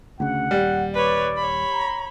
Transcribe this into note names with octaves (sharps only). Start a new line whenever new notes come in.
D2 C#3 F#5
D#1 G3
B4 C#5 D5
C#5 B5
A#5